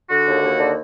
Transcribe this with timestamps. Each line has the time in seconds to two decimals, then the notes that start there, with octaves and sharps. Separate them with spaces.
0.10 D3 F#4
0.27 D#2
0.43 D#2
0.59 D3